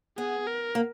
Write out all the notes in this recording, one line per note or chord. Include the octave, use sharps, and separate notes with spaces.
B3 G#4
A#4
A#3